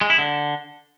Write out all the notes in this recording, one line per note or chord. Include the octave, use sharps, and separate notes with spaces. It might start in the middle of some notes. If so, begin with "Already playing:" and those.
G#3
E4
D3